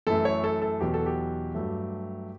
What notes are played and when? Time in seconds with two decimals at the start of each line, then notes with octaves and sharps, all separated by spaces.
0.07 F#2 E3 A3 A4
0.25 C#5
0.44 A4
0.62 A4
0.81 E2 B2 F#3 G4
0.94 A4
1.06 G4
1.55 G2 F#3 A3